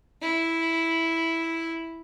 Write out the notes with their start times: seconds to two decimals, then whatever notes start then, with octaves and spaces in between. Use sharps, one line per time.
0.22 E4